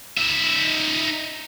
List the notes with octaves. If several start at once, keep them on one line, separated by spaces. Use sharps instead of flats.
D#4 E5